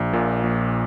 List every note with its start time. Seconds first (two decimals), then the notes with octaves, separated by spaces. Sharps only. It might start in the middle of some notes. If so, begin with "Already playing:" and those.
Already playing: A#1
0.13 A#2
0.43 A#1